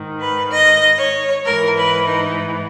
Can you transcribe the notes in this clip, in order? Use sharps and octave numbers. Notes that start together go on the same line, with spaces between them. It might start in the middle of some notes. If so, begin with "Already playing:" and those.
Already playing: G#2 D#3
B4
D#5
C#5
G#2 E3 A#4
B4
D#4